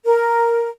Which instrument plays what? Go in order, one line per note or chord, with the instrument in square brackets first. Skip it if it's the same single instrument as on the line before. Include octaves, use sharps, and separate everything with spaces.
[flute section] A#4